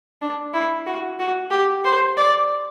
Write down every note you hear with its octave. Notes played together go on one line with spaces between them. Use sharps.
D4
E4
F#4
F#4
G4
C5
D5